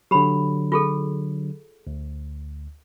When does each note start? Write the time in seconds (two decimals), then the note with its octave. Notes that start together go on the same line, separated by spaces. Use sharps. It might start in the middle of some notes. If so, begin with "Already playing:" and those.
0.11 D3 F#3 G4 B5
0.72 F4 G#4 A4
1.87 D2